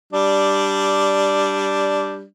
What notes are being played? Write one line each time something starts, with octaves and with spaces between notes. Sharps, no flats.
G3 D4